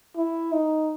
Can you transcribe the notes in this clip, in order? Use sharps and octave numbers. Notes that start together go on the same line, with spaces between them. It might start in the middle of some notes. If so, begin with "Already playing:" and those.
E4
D#4